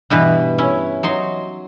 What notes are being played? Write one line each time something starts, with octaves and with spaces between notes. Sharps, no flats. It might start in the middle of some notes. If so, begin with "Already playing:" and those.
G2 B2 E3 B4
C#4 E4
F#3 D#4 C6